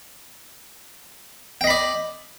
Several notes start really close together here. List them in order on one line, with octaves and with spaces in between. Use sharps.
G5 D#5 B5 D5